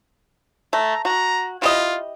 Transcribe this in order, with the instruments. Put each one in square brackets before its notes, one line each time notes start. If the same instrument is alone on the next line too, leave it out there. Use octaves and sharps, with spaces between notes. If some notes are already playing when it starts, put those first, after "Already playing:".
[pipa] A3 [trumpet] A#5
[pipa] F#4 [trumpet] A#5
[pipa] E4 G4 D#5 [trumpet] F4